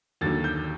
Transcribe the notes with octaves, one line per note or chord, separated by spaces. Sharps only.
D#2 D3 F#3 A6
G6